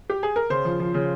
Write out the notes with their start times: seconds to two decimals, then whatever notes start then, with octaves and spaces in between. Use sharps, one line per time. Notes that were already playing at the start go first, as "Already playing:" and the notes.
0.10 G4
0.23 G#4
0.36 A#4
0.50 C#3 C5
0.65 F3
0.80 F3
0.94 C#3